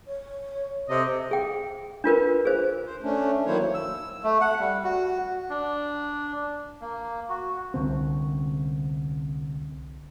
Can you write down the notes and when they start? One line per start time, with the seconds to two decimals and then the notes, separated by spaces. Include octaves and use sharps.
0.06 C#5
0.89 C3 A4 D#5
1.31 G#4 G5
2.04 D4 F4 A#4 B4
2.45 G#4 C5
2.85 C5
3.02 A3 C#4 D4
3.46 D#3 F#3 A#3 E4 C5 C#5
3.74 E6
4.24 A3
4.41 F#5
4.60 G3
4.84 F#4
5.50 D4
6.81 A#3
7.29 F#4
7.74 C2 D3 C4